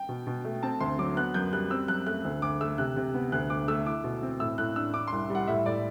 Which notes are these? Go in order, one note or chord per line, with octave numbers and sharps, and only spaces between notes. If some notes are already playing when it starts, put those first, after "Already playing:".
Already playing: G5
B2
B2
A3
C4 A5
D2 C6
F#3 D6
B3 F#6
F#2 G6
G3 F#6
C4 E6
F#2 F#6
A3 F#6
D2
D2 D6
A3 E6
C3 F#6
C3
B3
D2 F#6
D2 D6
A3 E6
E4 D6
B2
C4
A2 E6
A2 F#6
D4 E6
D4 D6
C6
C2
G3 F#5
A2 E5
A2 D5